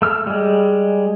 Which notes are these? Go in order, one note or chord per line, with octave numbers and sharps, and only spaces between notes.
A3 E6 F6
G3 G#3